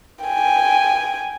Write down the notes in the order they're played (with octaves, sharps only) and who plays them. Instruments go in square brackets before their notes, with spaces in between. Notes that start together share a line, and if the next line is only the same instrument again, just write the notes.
[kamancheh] G5 G#5